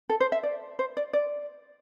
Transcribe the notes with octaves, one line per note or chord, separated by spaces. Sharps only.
A4
C5
E5
D5
C5
D5
D5